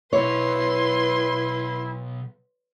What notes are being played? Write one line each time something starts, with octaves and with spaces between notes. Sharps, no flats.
B1 G#2 E4 B4 C#5 C6